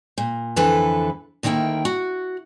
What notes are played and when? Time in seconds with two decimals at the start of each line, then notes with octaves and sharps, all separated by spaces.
0.18 A#2
0.56 F2 D3 E3 A4 B4
1.43 D2 D#3 A#3 E4 G5
1.85 F#4